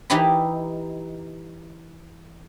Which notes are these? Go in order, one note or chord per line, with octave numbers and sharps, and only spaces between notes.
E3 D#4 E4 G4 D#5 B5